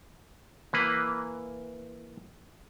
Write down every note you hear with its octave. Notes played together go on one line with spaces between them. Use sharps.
E3 A#3 B4